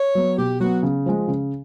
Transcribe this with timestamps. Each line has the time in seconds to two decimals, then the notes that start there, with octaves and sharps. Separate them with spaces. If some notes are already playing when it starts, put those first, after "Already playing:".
Already playing: C#5
0.15 F#3 B3
0.38 B2 G4
0.60 F#3 B3 F#4
0.83 C#3
1.06 F3 G#3
1.28 C#3